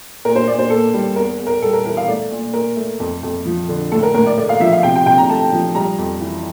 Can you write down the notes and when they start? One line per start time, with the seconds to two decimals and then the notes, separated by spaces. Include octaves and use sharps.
0.25 A#2 A#4
0.36 C5
0.47 A#2 D5
0.59 C5
0.70 A#3 A4
0.94 G3
1.16 E2 A#4
1.40 E2
1.47 A#4
1.62 G3 A4
1.73 A#4
1.85 E3 A#4
1.97 F5
2.08 A3 D5
2.31 A#2
2.53 A#2 A#4
2.77 A3
3.00 F2
3.23 F2
3.45 F3
3.69 D3
3.92 A2 A4
4.03 A#4
4.14 A2 A#4
4.26 D5
4.38 A3 D5
4.49 F5
4.60 F3 E5
4.72 F5
4.83 C3 G5
4.96 G5
5.06 C3 G5
5.18 A#5
5.29 A3 A5
5.52 F3
5.75 G3 A#5
5.98 F2
6.21 E3